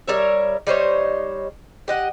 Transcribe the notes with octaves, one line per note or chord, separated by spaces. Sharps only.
G3 A#4 C#5 E5
G3 D#4 C5 C#5
G4 D#5 F#5